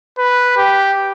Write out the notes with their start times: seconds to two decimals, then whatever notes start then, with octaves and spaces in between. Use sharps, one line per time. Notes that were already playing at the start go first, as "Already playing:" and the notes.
0.18 B4
0.57 G4